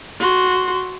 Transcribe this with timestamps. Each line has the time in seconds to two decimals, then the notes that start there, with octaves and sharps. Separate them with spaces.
0.20 F#4 C6